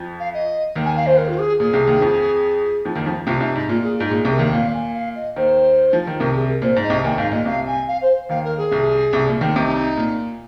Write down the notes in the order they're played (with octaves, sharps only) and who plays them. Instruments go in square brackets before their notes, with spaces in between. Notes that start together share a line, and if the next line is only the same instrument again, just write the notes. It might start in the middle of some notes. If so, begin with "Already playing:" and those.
Already playing: [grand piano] F2 F3
[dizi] F5
D#5
[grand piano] D#2 D#3
[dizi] G#5
F5
C5
A#4
F4
G#4
[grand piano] A#2 [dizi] G#4
[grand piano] C2 C3
D#2 D#3
F2 F3
F2 F3
D#2 D#3
F2 F3
[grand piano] C2 C3 [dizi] F4
[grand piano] C2 C3 [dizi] D#4
[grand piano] G#2 [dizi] D#4
[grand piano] A#2 [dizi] F4
[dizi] G#4
[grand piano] G#2 [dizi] F4
[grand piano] A#2 [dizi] G#4
[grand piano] C2 C3
[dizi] A#4
[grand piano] D#2 D#3
[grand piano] A#2 [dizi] F5
[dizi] G#5
F5
D#5
[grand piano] D#2 D#3 [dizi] C5
[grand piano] F3
D#3
[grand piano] C2 C3 [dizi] A#4
[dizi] G#4
A#4
[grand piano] A#2 [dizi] C5
[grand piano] G#2
[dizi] D#5
[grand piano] C2 C3
[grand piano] D#2 D#3 [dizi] G#5
[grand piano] G#2 [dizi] F5
[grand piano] A#2 [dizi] D#5
[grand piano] C2 C3 [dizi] F5
[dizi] G#5
F5
C5
[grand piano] D#2 D#3 [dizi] F5
[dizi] A#4
G#4
[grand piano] C2 C3
C2 C3
A#2
D#2 D#3
[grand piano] C2 C3 [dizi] D#4
[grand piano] A#2